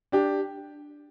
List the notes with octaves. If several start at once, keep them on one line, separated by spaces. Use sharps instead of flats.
D4 G4